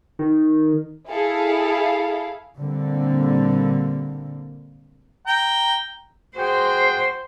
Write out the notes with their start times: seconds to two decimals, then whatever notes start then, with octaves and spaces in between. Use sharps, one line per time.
0.19 D#3
1.10 E4 G#4 A4 F5
2.57 A#2 D3 G3 A#3 C4
5.27 G5 A#5
6.37 F#4 G#4 C5 G5